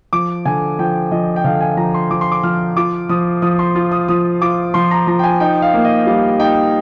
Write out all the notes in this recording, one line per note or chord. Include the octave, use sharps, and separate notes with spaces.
F3 D6
D3 G#5
F3 G5
F3 D#5
G5
D3 F5
G#5
F3 A#5
C6
F3 D6
C6
D6
F3 F6
F4 D6
F3 D#6
F3 D#6
C6
F4
D#6
F3 D#6
F4 D6
F3 C6
A#5
F3 A#5
G5
G#5
D#4 G5
F5
A#3
D#5
G3 F5
D#4 G5